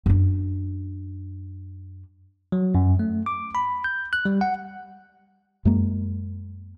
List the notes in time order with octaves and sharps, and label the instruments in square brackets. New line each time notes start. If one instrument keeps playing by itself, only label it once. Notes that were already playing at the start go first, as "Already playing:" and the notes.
[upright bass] F#2 D4
[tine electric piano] F#3
F#2
A3
D6
B5
G6
F#6
G3
F#5
[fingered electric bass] F#2 G#3 A#3